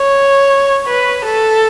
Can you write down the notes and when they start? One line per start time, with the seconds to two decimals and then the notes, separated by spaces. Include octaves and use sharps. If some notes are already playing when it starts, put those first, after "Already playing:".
Already playing: C#5
0.87 B4
1.25 A4